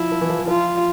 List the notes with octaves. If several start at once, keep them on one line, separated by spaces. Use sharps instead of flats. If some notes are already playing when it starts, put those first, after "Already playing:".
Already playing: F3 E4
F3
E3
F3
E3
F3 F4